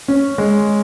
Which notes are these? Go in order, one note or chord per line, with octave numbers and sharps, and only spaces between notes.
C#4
G#3